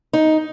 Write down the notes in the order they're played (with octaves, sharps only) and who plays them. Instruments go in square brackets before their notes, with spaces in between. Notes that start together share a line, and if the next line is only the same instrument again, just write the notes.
[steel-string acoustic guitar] D#4